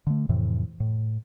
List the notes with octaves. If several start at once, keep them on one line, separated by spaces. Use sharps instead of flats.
D3 A3
F2 A2 C3 E3
A2